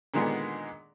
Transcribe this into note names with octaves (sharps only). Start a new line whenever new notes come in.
A#2 D3 D#3 G#3 B3